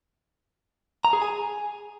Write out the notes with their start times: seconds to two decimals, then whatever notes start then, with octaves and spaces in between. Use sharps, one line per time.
1.05 A#5
1.13 G#4
1.22 G#5